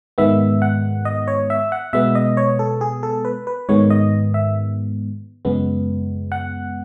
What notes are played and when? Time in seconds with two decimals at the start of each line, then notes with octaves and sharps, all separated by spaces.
0.18 G#2 D#3 G#3 B3 E5
0.62 F#5
1.05 D#5
1.28 C#5
1.50 E5
1.72 F#5
1.93 B2 G#3 B3 E5
2.15 D#5
2.37 C#5
2.59 A4
2.81 G#4
3.03 A4
3.25 B4
3.47 B4
3.69 G#2 D#3 G#3 B3 C#5
3.90 D#5
4.34 E5
5.45 F#2 C#3 G#3 B3
6.32 F#5